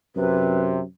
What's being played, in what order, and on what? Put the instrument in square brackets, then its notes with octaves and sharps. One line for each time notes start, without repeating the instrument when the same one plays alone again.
[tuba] F#2 [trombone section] C3 [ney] B4